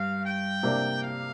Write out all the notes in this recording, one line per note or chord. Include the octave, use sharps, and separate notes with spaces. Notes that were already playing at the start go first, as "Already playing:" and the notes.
Already playing: G2 F5
G5
C3 A#3 D4
F5